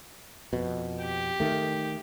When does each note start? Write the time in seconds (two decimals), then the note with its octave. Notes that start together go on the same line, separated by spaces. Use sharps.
0.53 F2 B2
1.02 G4
1.40 D#3 A3